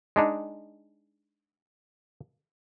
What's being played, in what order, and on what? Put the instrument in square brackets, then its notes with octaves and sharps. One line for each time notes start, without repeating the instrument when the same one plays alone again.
[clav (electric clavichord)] G#3 D4 D#4